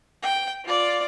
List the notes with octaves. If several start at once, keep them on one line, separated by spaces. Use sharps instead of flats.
G5
F4 D5